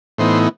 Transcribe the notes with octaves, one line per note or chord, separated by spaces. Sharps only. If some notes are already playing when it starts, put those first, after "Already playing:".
A2 E3 B3 D#4 C5